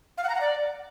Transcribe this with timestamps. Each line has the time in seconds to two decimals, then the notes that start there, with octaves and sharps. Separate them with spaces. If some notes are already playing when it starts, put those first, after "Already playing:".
0.18 F5
0.23 F#5
0.29 A#5
0.35 F#5
0.41 D5